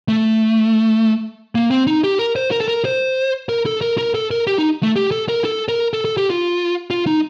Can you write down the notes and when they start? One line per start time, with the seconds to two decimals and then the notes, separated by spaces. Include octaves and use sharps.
0.08 A3
1.55 A#3
1.71 C4
1.87 D#4
2.04 G4
2.19 A#4
2.36 C5
2.51 A#4
2.61 A4
2.68 A#4
2.85 C5
3.49 A#4
3.66 A4
3.81 A#4
3.98 A#4
4.15 A4
4.31 A#4
4.47 G4
4.58 D#4
4.83 A3
4.96 G4
5.11 A4
5.28 A#4
5.45 A4
5.68 A#4
5.93 A4
6.05 A4
6.17 G4
6.30 F4
6.91 F4
7.07 D#4